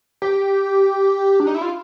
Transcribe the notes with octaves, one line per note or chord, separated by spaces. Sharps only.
G4
D4
D#4
E4
F4